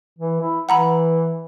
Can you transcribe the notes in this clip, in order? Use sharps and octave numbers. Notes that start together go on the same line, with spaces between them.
E3
E4
E3 F#5 A#5 B5